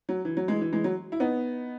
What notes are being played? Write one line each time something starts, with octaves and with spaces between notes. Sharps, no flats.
F#3
E3
F#3
E3 G#3
E3
E3 G#3
F#3
E4
B3 D#4